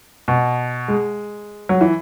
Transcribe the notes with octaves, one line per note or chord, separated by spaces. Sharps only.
B2
G#3
F#3
E3